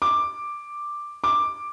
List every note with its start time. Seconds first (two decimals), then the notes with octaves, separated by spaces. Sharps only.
0.02 D6
1.24 D6